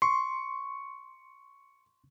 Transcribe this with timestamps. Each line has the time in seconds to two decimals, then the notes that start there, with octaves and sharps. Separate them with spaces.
0.02 C6 C#6